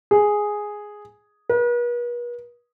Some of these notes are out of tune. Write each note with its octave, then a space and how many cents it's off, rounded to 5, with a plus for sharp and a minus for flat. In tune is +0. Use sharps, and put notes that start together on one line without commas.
G#4 +0
B4 -45